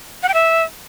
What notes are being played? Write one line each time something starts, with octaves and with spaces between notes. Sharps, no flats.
F#5
G5
E5